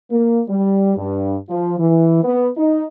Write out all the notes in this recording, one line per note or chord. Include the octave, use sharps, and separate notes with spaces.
A#3
G3
G2
F3
E3
B3
D#4